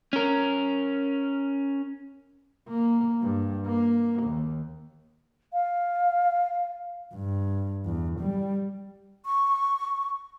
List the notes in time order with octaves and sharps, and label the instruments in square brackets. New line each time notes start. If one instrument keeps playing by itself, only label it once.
[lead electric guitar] C#4 A#4
[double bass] A#3
G2
A#3
D#2
[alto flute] F5
[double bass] G2
E2
G3
[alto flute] C#6